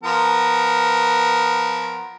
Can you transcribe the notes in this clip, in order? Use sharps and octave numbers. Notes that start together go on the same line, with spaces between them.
F3 B3 A#4